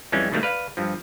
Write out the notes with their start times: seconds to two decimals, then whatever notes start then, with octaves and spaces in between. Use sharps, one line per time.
0.12 F2 E3 G3 G#3 C#4
0.32 B2 D#3 G3 A3 A#3
0.43 B4 D5 F5
0.77 G2 F3